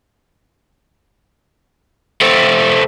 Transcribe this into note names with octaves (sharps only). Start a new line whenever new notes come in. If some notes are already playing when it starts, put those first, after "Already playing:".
A3 C4